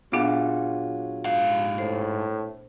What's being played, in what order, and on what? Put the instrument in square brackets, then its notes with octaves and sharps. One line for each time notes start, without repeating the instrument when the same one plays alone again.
[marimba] A#2 B3 D4 [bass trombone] F#3 [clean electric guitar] F4 G#4 F#5
[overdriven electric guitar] G#2 F5
[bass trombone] A2 [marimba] C5